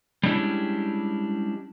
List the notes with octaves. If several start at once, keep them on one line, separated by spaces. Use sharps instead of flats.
G3 G#3 C#4 D4 E4 G4